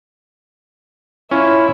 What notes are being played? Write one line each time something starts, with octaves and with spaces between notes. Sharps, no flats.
C#4 E4 F4